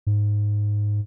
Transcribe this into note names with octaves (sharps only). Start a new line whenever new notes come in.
G#2